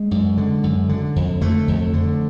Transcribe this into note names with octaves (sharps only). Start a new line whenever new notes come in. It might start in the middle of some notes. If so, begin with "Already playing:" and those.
Already playing: G#3
F#2
D3
F#2
D3
F2
D3 A3
F2
D3